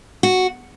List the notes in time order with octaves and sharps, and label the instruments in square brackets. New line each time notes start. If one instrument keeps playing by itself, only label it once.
[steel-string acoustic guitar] F#4